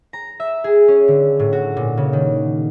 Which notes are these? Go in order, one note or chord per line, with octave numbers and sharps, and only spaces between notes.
A#5
E5
G#4
C#4
D3
A2
F#4
A#2
C#3
D#3